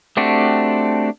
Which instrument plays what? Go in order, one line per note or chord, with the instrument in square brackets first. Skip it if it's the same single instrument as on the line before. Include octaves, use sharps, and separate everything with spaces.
[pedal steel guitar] A3 C4 D4 F#4 G4